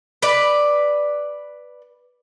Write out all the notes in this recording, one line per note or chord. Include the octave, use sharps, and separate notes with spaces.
B4 D5